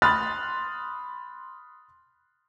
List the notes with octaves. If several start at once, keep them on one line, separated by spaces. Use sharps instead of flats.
B5 C6 D#6 F6 F#6 A6